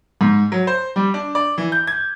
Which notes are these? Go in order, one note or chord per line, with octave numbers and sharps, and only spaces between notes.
G#2
F#3
C5
G3
D4
D5
E3
G6
G#6